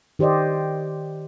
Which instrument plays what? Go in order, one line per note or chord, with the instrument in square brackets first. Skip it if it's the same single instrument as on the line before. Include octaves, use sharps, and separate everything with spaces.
[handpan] D#3 G4 C5 D5 D#5